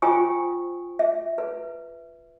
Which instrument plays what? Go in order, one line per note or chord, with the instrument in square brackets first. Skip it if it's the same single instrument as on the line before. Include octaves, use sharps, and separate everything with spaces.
[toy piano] F4 C5 G5 G#5 C#6 D#6
E5
B4